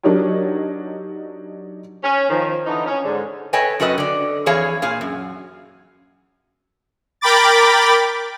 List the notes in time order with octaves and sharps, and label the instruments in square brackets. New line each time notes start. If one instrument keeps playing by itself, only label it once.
[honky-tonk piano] F#3 D4 D#4 G4 A#4 C#5
[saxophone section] C#4
D#3 F3
D3 E3 D#4
C#4
G#2 D3
[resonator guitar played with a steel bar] A4 B4 C#5 D#5 G5 G#5
F#2 F#4 A4 B4 D#5
D3 D5
F2 E3 G#4 C#5 F5
A#2 G#4 F5
F#2
[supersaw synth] A#4 G5 B5 D6 A6